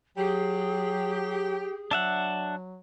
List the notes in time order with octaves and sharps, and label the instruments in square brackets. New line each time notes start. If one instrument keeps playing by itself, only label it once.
[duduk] F#3 [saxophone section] G4 [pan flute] G#4
[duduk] F#3 [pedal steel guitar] D4 E5 F#5